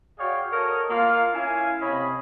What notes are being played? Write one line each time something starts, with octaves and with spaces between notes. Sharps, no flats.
F#4 G#4 C#5 D5 F5 G5
A4 A#4 C#5 D#5
A#3 F4 F5
C#4 E4 F5 G#5
C3 C#5 D#5 B5